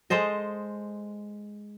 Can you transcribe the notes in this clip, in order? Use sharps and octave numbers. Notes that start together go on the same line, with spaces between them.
G#3 A4 C5 D#5